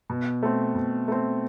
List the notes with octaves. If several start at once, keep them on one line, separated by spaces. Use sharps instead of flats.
B2
A3 C4
B2
A3 C4